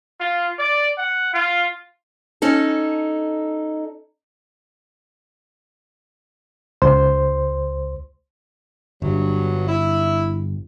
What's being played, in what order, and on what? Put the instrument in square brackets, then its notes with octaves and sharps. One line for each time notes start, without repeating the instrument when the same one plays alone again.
[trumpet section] F4
D5
F#5
F4
[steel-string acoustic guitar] C#4 D#4 A4
[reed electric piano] C#2 C5 C6
[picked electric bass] G1 [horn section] G2 F#3
[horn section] E4